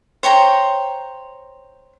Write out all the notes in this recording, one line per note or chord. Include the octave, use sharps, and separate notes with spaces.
C5 C#5 G5 A#5